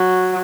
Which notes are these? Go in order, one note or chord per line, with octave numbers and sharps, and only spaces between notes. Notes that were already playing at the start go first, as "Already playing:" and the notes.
Already playing: F#3